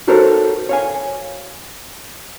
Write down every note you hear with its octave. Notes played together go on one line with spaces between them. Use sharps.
D#4 F#4 A4 A#4 C5 C#5
C#5 F5 G#5